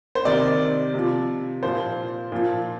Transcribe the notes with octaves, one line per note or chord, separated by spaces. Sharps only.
C5
C3 D#3 D5
C3 F3
A#2 F3 C5
A#2 F3